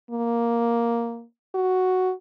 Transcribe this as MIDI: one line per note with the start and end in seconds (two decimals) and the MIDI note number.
0.10 1.24 58
1.55 2.12 66